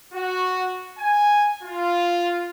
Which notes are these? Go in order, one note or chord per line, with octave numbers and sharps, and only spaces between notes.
F#4
G#5
F4